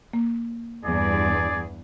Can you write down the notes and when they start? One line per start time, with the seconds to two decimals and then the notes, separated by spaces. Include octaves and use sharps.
0.13 A#3
0.84 E2 G2 G#4 D5